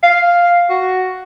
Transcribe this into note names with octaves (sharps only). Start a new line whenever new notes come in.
F5
F#4